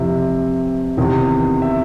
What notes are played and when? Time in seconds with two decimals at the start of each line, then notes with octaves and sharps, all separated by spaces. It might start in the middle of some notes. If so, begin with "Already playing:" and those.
Already playing: F2 C3 E3 E5
0.97 E2 C3 D#3
1.62 E5